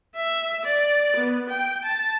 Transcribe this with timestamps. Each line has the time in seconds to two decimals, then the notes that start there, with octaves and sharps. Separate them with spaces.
0.16 E5
0.65 D5
1.16 B3
1.49 G5
1.85 A5